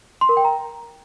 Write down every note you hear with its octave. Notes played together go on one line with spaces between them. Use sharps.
C6
A#4
G5
A#5